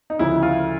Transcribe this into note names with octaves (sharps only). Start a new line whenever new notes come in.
D#4
D2 C#3 F3 E4
F4